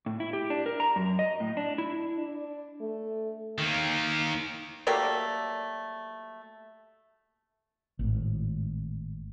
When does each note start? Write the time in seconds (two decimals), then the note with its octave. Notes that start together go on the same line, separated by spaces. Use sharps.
0.06 A2
0.20 E4
0.33 G4
0.50 D4
0.66 A#4
0.80 A#5
0.96 F#2
1.19 D#5
1.40 A2
1.57 D4
1.78 E4
2.19 D4
2.80 A3
3.58 D#3 A#3
4.87 F#3 G3 A3 A#3
7.99 G#1 A2